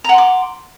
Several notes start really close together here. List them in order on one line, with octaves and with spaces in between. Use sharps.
A#5 F#5 C6 D6